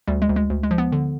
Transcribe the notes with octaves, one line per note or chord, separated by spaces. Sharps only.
D2 G3
G#3
D2
G#3
D2
G#3
F3
B3
D3